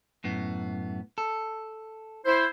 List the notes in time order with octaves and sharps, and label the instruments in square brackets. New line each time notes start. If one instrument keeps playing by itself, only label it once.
[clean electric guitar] F#2 A2 B3
A4
[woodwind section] E4 C5